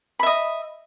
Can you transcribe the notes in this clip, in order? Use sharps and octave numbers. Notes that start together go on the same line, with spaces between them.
D#5 E5 B5